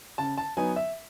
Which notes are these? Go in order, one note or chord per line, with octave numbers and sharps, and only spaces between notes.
C#3 A5
A5
F#3 B3 D#4 G#5
E5